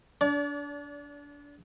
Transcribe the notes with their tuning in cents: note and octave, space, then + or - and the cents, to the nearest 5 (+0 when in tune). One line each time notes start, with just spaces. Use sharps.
D4 -25 D5 -40